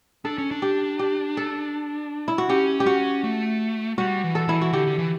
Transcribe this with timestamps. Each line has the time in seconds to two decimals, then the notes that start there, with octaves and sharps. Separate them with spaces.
0.25 D4 A4
0.38 C#4
0.51 D4
0.62 G4
0.99 G4
1.37 A4
2.28 E4
2.38 F#4
2.49 C#4 G4
2.80 G4
2.86 C#4 F#4
3.24 A3
3.98 G3 F#4
4.24 E3
4.35 A4
4.48 E3 E4
4.62 F#4
4.73 D3 G4
4.87 D3
4.99 E3